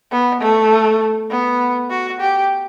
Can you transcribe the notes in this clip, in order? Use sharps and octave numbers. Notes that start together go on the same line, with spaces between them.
B3
A3
B3
F#4
G4